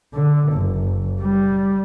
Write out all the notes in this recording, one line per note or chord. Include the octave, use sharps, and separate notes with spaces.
D3
F#1
G3